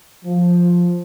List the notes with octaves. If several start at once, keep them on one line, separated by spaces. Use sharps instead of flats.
F3